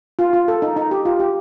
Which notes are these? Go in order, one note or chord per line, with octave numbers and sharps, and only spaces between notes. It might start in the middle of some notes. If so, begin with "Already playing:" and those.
F4
F4
A4
D#4
D#4
G4
F4
G4